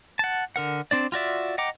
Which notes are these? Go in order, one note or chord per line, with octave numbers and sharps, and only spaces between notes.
F#5 A5
D3 A#4 F#5
C4 D4 D5
F4 F#4 D5 E5
D#5 F#5 G5 A#5 D6